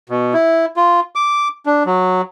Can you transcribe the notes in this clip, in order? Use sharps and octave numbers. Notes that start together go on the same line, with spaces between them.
B2
E4
F4
D6
D4
F#3